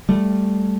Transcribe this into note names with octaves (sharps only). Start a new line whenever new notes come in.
G3 A3